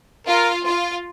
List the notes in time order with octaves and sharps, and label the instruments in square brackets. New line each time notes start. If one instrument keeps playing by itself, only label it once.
[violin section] F4 [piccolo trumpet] A#4
[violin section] F4